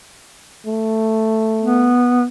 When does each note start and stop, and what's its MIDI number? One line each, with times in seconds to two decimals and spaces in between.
0.66 1.96 57
1.62 2.26 59